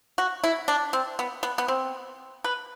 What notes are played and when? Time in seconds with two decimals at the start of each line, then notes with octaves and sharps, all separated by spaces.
0.18 F#4
0.44 E4
0.68 D4
0.93 C4
1.19 B3
1.43 B3
1.58 B3
1.68 C4
2.44 B4